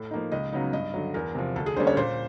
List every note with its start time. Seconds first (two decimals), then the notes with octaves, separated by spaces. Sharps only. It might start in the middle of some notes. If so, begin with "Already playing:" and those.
Already playing: A2
0.11 F3 A#3 D#4
0.32 C#2 D#5
0.53 C#3 F#3 B3 D#4
0.73 G2 D#5
0.94 D3 F#3
1.14 E2 A#4
1.35 C3 F3
1.56 D2 A4
1.66 G#4
1.77 D3 G3 A#3 C#4 C5
1.87 C#5
1.97 A#2 C5